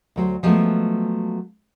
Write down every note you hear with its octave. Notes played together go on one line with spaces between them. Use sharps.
D2 F#3 C5
F3 F#3 G#3 A3 B3